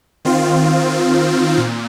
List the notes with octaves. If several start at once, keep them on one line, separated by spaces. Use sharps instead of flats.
D#3 C4 F4
A#2